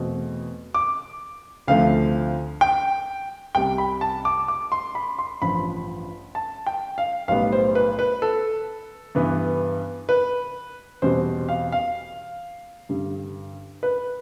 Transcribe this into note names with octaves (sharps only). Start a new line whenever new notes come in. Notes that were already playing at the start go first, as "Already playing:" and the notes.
Already playing: E2 B2 A3 C4
D6
D2 D3 F3 A3 C4 F5
G5
C2 C3 G3 G5
B5
A5
D6
D6
C6
B5
C6
A1 G2 F3 B5
A5
G5
F5
B1 A2 G3 B3 F5
C5
B4
B4
A4
G2 E3 B3
B4
E2 B2 G3 C4 C5
F5
F5
G2 D3 G3
B4